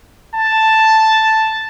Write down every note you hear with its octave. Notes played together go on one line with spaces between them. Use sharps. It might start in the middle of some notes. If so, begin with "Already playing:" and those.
A5